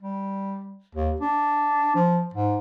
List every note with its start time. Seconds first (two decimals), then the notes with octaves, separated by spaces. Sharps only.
0.02 G3
0.95 D#2
1.20 D4
1.95 F3
2.34 G#2